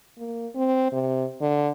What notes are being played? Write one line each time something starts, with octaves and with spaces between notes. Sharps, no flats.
A#3
C4
C3
D3